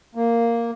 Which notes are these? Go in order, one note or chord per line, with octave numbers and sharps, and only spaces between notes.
A#3